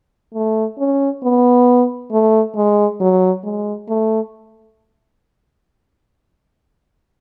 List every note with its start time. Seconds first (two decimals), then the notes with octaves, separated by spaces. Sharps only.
0.34 A3
0.78 C#4
1.23 B3
2.11 A3
2.55 G#3
3.00 F#3
3.44 G#3
3.89 A3